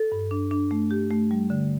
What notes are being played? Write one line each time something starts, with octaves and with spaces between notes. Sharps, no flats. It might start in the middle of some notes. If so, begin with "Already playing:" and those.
Already playing: A4
G2
D4
D4
A3
G4
A3
G3
D3